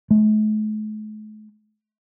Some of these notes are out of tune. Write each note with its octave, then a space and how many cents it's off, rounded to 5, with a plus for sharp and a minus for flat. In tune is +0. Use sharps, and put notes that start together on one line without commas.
A3 -45